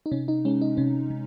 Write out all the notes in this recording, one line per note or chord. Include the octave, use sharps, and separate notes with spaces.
D#4
C3 C#4
D#4
G#3 C#4
D#4
C3 C#4
C3